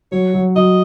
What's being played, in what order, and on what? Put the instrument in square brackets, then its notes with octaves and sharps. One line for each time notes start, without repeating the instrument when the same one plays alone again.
[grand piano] F#3 [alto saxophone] C#5
[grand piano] F#3
[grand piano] F#3 [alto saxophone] D#5